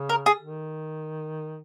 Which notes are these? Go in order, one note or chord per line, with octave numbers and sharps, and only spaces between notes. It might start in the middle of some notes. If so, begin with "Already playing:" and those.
Already playing: C#3
A#4
G#4
D#3